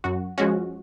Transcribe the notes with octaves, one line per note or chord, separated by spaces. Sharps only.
F#2 F#4
F3 G#3 C#4 F#4